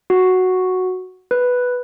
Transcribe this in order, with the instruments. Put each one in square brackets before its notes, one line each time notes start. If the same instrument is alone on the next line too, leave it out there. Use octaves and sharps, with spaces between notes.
[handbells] F#4
B4